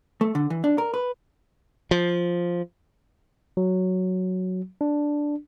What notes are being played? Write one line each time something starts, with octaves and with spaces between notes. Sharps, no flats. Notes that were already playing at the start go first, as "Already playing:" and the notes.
A3
D3
E3
D4
A#4
B4
F3
F#3
D4